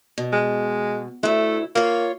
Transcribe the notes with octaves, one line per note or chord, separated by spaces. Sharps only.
B2
G#3
D2 A3 E4
A#3 F4 C#5